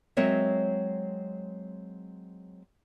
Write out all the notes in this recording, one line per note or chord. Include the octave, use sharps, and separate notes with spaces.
F#3 G#3 C4 A#4 C#5 E5